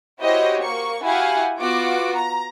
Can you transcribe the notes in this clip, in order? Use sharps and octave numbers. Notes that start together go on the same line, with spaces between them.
E4 F#4 G4 C5 C#5 D#5
A#3 C#6
E4 F#4 G4 F5 F#5 G#5
B3 F4 F#4 D6
A#5